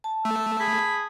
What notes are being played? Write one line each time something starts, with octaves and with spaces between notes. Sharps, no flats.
A5
A3 E6
G#4 B5